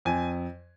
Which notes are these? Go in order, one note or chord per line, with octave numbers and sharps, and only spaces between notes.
F2 G#5